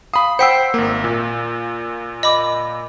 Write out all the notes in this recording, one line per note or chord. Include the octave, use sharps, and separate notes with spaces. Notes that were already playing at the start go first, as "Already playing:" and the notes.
F5 B5 D#6
C5 F#5 G5 E6 B6 C7
G#1 A#3
A#2
D#5 B5 D6